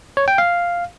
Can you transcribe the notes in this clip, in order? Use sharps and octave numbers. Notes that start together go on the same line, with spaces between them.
C#5
G5
F5